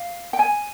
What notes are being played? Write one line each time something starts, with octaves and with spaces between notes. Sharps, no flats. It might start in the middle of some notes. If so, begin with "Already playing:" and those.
Already playing: F5
G5
G#5